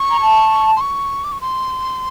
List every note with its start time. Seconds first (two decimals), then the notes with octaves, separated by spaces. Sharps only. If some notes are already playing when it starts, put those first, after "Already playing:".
Already playing: C#6
0.10 A#5
0.19 A5
0.77 C6
0.81 C#6
1.24 D6
1.32 C#6
1.41 C6